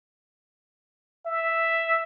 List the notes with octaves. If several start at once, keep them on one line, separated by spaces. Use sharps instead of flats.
E5